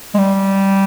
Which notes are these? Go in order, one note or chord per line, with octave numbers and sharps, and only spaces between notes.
G#3
G3